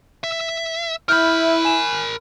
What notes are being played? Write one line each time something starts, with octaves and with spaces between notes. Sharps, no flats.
E5
E4 A#4 B5 F6 G6
G#5 E7